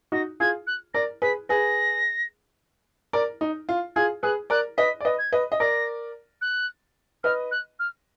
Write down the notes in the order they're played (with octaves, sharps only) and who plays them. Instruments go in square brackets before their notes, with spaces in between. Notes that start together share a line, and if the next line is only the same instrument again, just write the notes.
[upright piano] D#4 F#4 [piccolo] A#6
[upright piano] F4 G#4 [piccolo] G#6
[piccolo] F#6
[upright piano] A#4 D5 [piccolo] A#6
[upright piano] G#4 B4 [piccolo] B6
[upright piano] G#4 B4 [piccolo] A#6
[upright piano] A#4 D5
D#4
F4
[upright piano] F4 G#4 [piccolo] G#6
[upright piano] G#4 B4 [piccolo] F#6
[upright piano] A#4 D5 [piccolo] F#6
[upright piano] B4 D#5 [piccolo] B6
[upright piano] D5
B4 D#5
[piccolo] G#6
[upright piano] B4 D#5
D#5
[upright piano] A#4 D5 [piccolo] A#6
[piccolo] F#6
[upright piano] B4 D#5 [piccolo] F6
[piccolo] F#6
F6